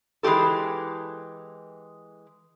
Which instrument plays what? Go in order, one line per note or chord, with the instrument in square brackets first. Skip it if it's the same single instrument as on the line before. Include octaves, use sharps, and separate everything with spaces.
[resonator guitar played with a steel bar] E3 G#3 C#4 G4 A4